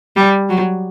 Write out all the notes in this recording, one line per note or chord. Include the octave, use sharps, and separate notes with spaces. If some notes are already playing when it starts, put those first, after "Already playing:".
G3
F#3